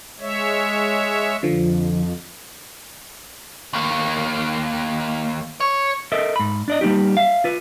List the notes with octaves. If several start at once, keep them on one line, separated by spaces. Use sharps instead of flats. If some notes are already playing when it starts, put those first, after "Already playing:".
G#3 C#5 E5
F2 D3 F3
D#2 A#3
C#5
A4 A#4 D#5 E5
G#2 B5
D4 D5 D#5
G3 A#3 B3 D#4 G4
E5 F5
F4 B4